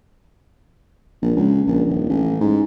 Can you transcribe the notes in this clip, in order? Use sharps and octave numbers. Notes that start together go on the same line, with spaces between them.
A#1
C#2
A#1
D#1
A1
G#2